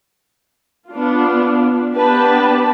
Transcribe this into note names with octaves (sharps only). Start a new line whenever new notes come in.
B3 D4 F4
B3 D4 G4 B4 A5